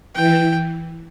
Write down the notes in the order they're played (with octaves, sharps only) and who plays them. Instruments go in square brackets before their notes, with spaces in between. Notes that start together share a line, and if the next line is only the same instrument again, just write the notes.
[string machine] E3 [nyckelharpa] G5